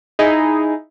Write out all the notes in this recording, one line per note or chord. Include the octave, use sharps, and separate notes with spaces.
D#4 E4 G#4